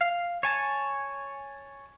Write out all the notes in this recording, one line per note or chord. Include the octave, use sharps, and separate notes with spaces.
F5
C#5 G#5 A5